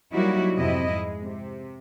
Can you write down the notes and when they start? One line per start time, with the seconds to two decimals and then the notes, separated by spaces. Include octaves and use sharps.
0.14 F#3 G3 A#3 D#4 E4 F#4
0.56 F2 G#2 C3 E4 D#5
0.92 G#3
1.23 C3